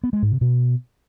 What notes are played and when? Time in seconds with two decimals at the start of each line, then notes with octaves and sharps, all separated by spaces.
0.03 B3
0.13 G#3
0.22 G#2
0.32 C3
0.41 B2